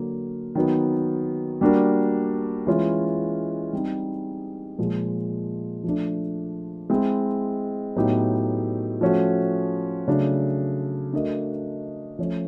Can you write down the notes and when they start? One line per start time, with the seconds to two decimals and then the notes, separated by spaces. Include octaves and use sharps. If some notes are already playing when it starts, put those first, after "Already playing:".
Already playing: D3 F#3 A#3
0.55 D#3 F#3 B3
1.61 G3 A#3 D4 F#4 A#4
2.67 E3 G#3 C#4 F4
3.73 G3 C4 D#4
4.78 A#2 F3 G#3
5.84 F3 A3 D4
6.90 G#3 C4 E4
7.96 A2 F#3 B3 D#4 G4
9.01 F3 A3 C#4 F#4
10.07 C#3 F#3 A3 D4
11.13 A3 D4 F#4 A#4 D#5
12.19 F3 A3 C#4